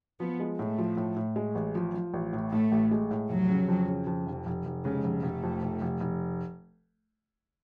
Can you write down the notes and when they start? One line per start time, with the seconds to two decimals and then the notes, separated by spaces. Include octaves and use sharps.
0.19 F3 B3
0.40 G#3
0.58 A2 A3
0.78 F3
0.97 A2
1.16 A2
1.36 G#3
1.55 A1
1.75 F3
1.94 F3
2.13 A1
2.33 A2
2.52 A2 A3
2.72 A1
2.91 G#3
3.11 A2
3.29 F1 F#3
3.49 C#3
3.68 F2
3.88 C#3
4.07 F2
4.26 F1
4.46 F1
4.65 F1
4.84 C#3 G#3
5.04 F1
5.23 F1 A3
5.43 F2
5.62 F1
5.81 F1
6.00 F1